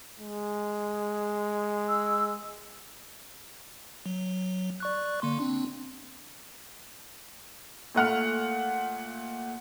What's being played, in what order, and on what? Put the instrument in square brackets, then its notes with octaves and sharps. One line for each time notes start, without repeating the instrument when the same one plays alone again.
[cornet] G#3
[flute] E6
[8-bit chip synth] F#3
D5 C#6 F#6
D3 A#3 C6
C4 D4
[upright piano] A#2 A3 F#5 F6